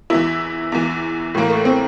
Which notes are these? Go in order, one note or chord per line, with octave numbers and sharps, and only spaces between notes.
E2 E3 E4
E2 E3
A2 E3 A#3
A3
C4